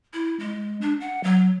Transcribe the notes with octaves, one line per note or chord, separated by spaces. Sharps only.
E4
G#3
D4
F#5
F#3